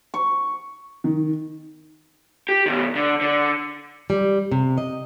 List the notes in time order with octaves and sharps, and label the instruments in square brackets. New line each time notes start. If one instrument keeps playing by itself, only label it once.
[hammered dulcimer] C#6
[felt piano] D#3
[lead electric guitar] G4
B2 D#3
D3
D3
[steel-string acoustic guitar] G3
C3
D#5